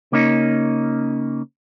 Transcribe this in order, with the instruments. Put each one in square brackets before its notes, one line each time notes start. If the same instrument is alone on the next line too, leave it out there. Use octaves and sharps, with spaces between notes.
[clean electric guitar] C#3 A#3 C#4 D#4